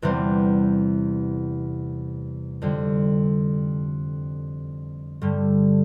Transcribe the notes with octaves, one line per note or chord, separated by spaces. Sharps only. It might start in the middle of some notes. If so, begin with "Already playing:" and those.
E2 C3 E3 G3 C4
F2 D3 G3
G2 D3 G3